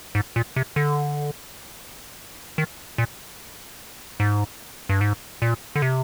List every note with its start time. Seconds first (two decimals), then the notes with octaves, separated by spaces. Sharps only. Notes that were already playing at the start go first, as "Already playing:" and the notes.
0.15 G#2
0.36 A#2
0.56 C3
0.76 D3
2.58 D#3
2.98 A#2
4.20 G#2
4.89 G2
5.01 G#2
5.42 A#2
5.76 D3
5.82 C3